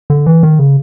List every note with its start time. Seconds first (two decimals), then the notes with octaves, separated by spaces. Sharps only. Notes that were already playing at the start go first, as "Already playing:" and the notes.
0.10 D3
0.26 E3
0.43 D#3
0.59 C#3